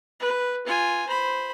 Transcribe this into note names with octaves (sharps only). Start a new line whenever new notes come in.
B4
F4 G#5
C5 B5